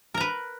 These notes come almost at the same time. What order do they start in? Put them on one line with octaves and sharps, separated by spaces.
A#4 A#5 B4